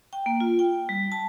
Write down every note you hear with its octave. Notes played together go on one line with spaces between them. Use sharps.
G5
A#3
F4
G5
G3
A5